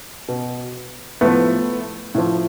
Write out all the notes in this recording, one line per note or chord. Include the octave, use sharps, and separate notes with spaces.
B2
A2 F3 A3 B3
A2 F3